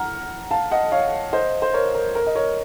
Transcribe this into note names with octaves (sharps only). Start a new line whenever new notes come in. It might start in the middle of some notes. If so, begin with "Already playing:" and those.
Already playing: F#5 A#5 F6
F5 A5
D#5 F#5
C#5 F5
C5 D#5
C5
A#4 C#5
A#4
A#4
D#5
A#4 C#5